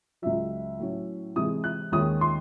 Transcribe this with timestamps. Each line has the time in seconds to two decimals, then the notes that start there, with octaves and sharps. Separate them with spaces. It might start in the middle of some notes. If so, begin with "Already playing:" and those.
0.22 C#2 C#3 F#3 E5
0.79 A2 F#3 C#4
1.36 C3 E3 G#3 D#6
1.64 F#6
1.92 D#2 D#3 G#3 C#4 D#6
2.21 C6